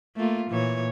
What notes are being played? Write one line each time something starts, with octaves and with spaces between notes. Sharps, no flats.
A3 A#3 F4
A#2 E3 C#5